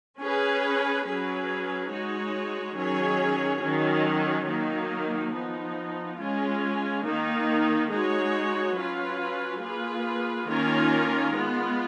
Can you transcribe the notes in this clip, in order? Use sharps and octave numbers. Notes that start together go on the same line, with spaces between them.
C#4 G#4 B4
F#3 C#4 G#4 B4
G#3 D#4 F#4 C#5
D#3 F#3 C#4 G#4 C#5
D#3 F#3 C#4
D#3 F#3 A#3 D#4
F3 B3 D#4
G#3 C#4 F4
D#3 A#3 D#4
G#3 D#4 F#4 C#5
F#3 C#4 F4 B4
A#3 F4 G#4 B4
D#3 A#3 C#4 F4 A#4
G#3 B3 F4